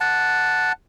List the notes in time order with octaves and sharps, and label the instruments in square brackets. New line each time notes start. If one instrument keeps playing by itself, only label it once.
[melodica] F#5 A5